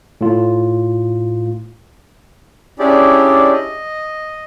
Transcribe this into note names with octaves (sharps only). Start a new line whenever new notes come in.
A2 F4
C#4 D4 E4 G4 G#4 D5
D#5